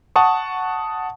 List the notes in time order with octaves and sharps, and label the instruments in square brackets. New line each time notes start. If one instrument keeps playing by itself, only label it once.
[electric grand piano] F#5 A5 C#6 D#6